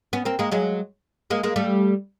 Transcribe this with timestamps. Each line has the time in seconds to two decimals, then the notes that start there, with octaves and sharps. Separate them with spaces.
0.13 B3 C#4
0.25 A#3 C4
0.39 G#3 A#3
0.52 F#3 G#3
1.30 G#3 A#3
1.43 G#3 A#3
1.56 G3 A3